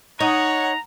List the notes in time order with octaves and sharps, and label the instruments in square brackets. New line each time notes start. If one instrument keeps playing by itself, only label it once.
[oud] D#4 [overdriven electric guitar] C#5 [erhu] F#5 [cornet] A#5